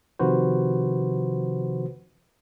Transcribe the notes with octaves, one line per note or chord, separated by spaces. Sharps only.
C3 D#3 F3 F#4 B4 C5